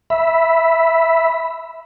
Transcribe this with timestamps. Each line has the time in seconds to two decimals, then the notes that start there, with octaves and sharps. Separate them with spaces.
0.10 E5 B5